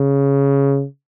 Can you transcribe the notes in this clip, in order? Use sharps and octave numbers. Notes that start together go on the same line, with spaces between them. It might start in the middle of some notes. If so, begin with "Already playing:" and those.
Already playing: C#3